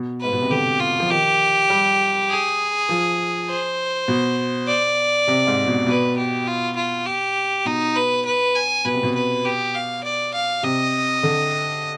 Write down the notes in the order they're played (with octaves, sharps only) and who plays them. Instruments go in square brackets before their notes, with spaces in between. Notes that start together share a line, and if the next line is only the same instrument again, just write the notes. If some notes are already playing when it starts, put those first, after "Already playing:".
Already playing: [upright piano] B2
[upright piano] G#2 [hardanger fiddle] B4
[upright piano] B2
C3
[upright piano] D3 [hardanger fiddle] G4
[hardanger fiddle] F4
[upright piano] F3
[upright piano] D#3 [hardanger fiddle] G4
[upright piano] G3
[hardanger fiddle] G#4
[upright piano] F3
[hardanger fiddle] C5
[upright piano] B2
[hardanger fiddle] D5
[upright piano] C3
G#2
B2
[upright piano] B2 [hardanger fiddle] B4
[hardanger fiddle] G4
F4
F4
G4
[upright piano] B2 [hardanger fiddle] D#4
[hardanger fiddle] B4
B4
G#5
[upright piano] B2 [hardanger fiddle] B4
[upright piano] C3
B2
[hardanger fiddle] B4
G4
F5
D5
F5
[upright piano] C3 [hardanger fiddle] D#5
[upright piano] D3